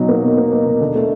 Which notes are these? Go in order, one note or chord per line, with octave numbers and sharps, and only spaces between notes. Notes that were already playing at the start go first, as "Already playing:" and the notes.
Already playing: B2 F#3 D#4
A#3
B2
A#3
A#3
B2
D3
A3